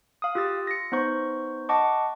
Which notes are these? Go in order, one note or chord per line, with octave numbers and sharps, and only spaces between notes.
F5 D#6
F4 G4 D#6 E6 A6
A#6 C#7
B3 D#4 C5 C#6
D#5 F#5 A5 C#6 D6